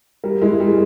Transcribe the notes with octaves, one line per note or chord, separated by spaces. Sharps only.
G3 A#4
G#3 E4
G3 G#3